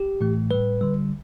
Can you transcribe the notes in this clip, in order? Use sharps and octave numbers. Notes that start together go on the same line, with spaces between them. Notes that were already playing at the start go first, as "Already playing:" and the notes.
Already playing: G4
A2 E3 A3
A2 G3 B4
D3 G3